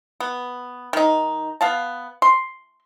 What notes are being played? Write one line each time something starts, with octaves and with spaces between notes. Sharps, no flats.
B3
D#3 D#4
B3 F5 A5
C6